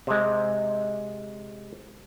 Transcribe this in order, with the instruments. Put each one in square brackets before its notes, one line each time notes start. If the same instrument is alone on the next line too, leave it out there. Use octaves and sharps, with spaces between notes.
[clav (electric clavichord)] C3 G#3